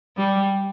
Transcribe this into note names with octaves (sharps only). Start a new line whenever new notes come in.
G3